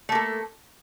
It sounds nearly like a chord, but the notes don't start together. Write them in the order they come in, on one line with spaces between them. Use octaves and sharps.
A3 A#3 A4